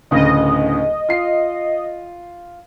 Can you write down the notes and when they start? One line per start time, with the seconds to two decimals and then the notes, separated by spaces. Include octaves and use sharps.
0.11 D1 D2 C#3 D#5
1.09 F4 C7